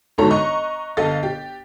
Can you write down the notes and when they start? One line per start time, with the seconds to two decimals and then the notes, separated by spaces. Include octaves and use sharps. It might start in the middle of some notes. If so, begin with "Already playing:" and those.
0.18 G1 G#2 B2 A4 C#5 A#5
0.31 D#5 A#5 C#6 F#6
0.97 G1 A4 D#5 F5 A6
1.23 G4